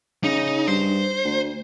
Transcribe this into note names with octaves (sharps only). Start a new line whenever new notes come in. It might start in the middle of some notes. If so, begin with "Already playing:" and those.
C#3 D#4
G2 C5
D2